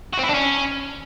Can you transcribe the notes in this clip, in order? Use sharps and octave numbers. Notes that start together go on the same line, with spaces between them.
F#4
C4
E4
D4
C#4